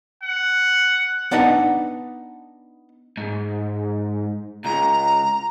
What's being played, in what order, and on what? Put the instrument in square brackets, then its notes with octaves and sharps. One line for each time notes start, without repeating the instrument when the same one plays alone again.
[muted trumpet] F#5
[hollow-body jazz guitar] B3 D4 D#4 B4 D#5 F#5
[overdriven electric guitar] G#2
[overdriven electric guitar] C#2 [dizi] A#5